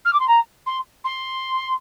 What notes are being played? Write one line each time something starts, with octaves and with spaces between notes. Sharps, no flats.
F6
D6
C6
A#5
C6
C6